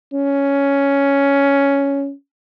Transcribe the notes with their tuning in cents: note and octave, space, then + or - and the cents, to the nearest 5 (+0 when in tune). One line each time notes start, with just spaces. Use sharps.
C#4 +10